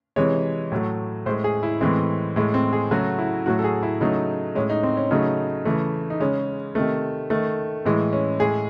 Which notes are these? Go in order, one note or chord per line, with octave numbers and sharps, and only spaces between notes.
C3 E3 G#3 C#5
A2 F#3 A3
A2 G#3 C5
G#4
E4
A2 E3 G#3 C4
A2 G#3
C4
G#4
C#3 F#3 A3 F#4
E4
A2 F#3 A3 F#4
A4
G#4
E4
C#3 F#3 A3 D#4
A2 G#3 C#4
D#4
C4
C#4
C#3 F#3 A3 D#4
C#3 E3 A3
D#4
C#3 G#3 C#4
C3 D#3 A3
D#3 A3
A2 E3 G#3
C#4
A2 G#3 G#4